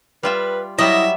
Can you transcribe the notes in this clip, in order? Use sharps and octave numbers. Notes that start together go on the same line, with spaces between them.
G3 F4 B4 E5
F#3 G3 B3 E4 D#5 E5